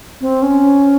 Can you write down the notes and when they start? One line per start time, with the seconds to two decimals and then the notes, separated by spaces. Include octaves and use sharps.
0.21 C4
0.42 C#4